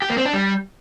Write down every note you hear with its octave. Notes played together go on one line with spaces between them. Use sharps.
G4
A#3
C4
D4
G3